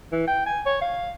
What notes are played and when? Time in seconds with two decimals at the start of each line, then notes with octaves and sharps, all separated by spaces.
0.12 E3
0.27 G5
0.46 G#5
0.66 C#5
0.81 F5